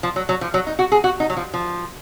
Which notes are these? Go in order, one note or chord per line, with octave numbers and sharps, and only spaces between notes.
F3
F#3
F#3
F3
F#3
D#4
F#4
G#4
F#4
D#4
F#3
F3
F3